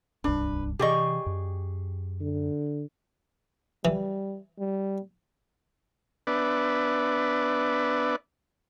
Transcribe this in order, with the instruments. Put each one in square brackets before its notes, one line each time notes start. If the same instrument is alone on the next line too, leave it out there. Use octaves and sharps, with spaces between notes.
[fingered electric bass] D1 C2 G2 [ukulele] D4 [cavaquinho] B4
[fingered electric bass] C3 E3 [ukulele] G4 D5 D#5 [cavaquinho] G#4 G5 C#6
[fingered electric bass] F#2
[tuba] D3
[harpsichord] E3 [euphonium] G3
[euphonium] G3
[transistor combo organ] B3 D4 B4 D5 E5